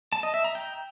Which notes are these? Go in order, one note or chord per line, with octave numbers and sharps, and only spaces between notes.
A5
D#5
E5
A#5
G5